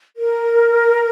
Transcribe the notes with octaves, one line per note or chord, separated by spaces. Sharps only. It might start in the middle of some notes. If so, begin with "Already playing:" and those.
A#4